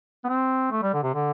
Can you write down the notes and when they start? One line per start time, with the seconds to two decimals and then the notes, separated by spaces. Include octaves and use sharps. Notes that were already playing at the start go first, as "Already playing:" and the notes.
0.24 B3
0.29 C4
0.71 A3
0.83 G3
0.93 D3
1.03 C3
1.15 D3